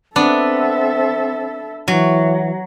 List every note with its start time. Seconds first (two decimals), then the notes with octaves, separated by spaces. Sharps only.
0.16 B3 C4 D4 A4 E5
1.88 E3 F#3